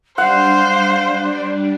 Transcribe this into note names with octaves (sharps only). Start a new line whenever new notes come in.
G3 D4 C5 F5 F#5